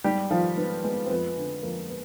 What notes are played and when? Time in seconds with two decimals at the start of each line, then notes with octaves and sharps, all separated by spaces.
0.04 G#2 G3 G4
0.30 D#3 F3 F4
0.57 G#2 B3
0.84 G#3 B3
1.06 C4
1.11 F2 B3
1.37 D3
1.63 F2 A#3
1.89 B3